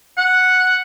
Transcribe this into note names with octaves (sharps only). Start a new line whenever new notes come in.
F#5